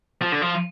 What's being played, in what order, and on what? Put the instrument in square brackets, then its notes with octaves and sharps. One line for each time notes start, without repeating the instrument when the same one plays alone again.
[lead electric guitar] F3
D3
F3